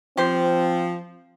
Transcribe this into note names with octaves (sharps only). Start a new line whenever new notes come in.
F3 C4 G4 C5